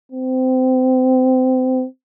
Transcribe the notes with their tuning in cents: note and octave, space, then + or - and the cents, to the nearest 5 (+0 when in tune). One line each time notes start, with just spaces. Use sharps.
C4 -25